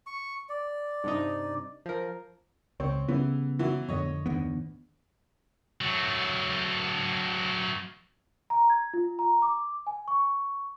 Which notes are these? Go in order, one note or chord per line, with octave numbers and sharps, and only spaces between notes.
C#6
D5
G2 C3 D#4
F3 A#4
C#2 C4 C#5
C#3 E3 G3 B3
E3 F#3 E4
F2 A2 D3 C#5 D#5
D2 D#3 B3
F#3 A3
A#5
G#6
F4
A#5
D6
G#5
C#6